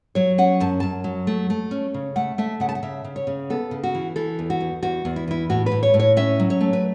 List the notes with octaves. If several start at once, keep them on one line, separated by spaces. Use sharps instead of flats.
F#3 C#5
C#4 F#5
F#2 A5
F#2 A5
F#3
A3
A3
C#4
C#3
A3 F#5
A3 E5
C#3 F#5
A5
F#5
C#3 E5
C#3
C#5
C#3
B3 A4
C#3
F#4
E3
E3 A4
E2
F#4
E2
E2 F#4
E2
E4
E3 E4
A2 F#4
B4
A2
C#5
A2
C#5
C#4 E5
F#3
C#5
A3
B4